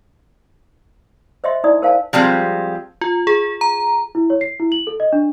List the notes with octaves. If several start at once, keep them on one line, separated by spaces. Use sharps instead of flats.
C5 D#5 E5 C6
D#4 E4 D5 D#6
A#4 C5 F5 G#5 A5
F3 G3 G#3 C4
F4
G#4
A#5
E4
C#5
C7
E4
F#7
A4
D#5
D4